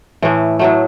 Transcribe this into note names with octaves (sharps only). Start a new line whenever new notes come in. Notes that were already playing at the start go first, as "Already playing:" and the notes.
A2 E3 A3
A2 F#3 A3